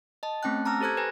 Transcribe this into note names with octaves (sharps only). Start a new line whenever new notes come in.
D#5 A5
A3 C4 C#4 G5 A5 F#6
A5 A#5 D6 E6 F6 A#6
G4 A4 C5 F#6 G#6
B4 G#5 A#6